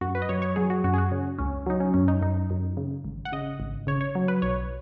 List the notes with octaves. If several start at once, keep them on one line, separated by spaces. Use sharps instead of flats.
F#2 F#4
B4
D#5
F#2 C#5
C#5
F#3 G#4
F#4
F#2 F#4
G#4
F#4
C#3
C#2 C#4
F#3 D#4
C#4
F#2 C#4
D#4
F#2 D#4
F#2
C#3
G#1
F#5
C#3 D#5
G#1
C#3 C#5
C#5
F#3
B4
B1 C#5